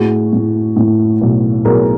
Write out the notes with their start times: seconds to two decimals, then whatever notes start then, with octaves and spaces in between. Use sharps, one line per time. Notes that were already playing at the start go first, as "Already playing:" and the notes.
Already playing: A2 F#4 G#4
0.33 A2
0.76 A2
1.21 B1
1.65 B1 G#4 A#4